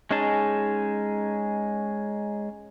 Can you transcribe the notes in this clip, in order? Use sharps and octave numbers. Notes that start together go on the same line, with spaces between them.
G#3 C#4 D#4 G#4 A5